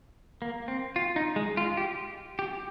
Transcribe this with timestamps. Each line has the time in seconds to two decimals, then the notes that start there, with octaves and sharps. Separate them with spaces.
0.42 A#3
0.68 C4
0.96 F4
1.16 D#4
1.36 G#3
1.57 F4
1.77 G4
2.39 G4